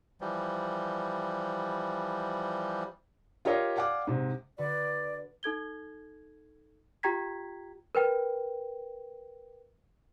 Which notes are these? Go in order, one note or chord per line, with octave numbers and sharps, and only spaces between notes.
E3 F3 G3
F4 G4 A#4 C#5 D#5 F5
D5 F5 F#5 G#5 D6
G#2 C3
D3 F#4 B4 D5
D#4 A4 G#6 G7
F4 G4 G5 A#5 G#6 B6
A#4 B4 G5